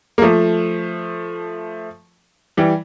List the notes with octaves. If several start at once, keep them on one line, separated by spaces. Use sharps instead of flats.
A#3
F3 A3
E3 G3